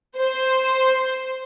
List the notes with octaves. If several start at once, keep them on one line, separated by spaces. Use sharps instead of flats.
C5